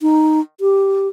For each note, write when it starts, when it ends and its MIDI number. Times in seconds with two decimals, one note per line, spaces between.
0.02 0.40 63
0.61 1.08 67